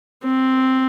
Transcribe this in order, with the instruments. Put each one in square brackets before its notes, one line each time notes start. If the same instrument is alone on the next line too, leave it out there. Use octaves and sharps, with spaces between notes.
[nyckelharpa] C4